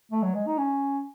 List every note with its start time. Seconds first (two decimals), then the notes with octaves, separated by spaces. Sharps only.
0.12 A3
0.23 F#3
0.34 G#3
0.47 D#4
0.58 C#4